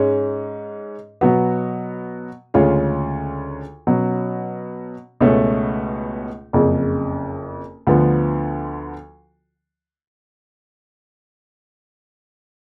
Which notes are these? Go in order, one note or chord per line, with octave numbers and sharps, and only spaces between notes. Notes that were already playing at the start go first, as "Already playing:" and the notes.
Already playing: G#2 G#3 C#4
B2 F#3 B3 F#4
D2 C#3 G#3 C#4 F4
B2 F#3 C#4
C#2 B2 A3 C#4
F#1 F2 C#3
D2 D3 F3 B3 F4